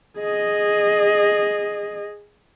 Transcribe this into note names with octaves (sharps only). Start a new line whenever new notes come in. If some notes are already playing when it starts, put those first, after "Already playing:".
G#4 D#5